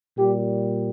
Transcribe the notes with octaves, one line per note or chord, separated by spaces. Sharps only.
A#2 G3 G4